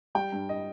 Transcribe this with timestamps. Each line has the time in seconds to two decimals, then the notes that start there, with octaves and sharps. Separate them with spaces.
0.15 G3 G5
0.32 G2
0.49 D#5